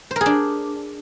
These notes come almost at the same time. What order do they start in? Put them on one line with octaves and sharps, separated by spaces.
C5 A#4 G#4 D4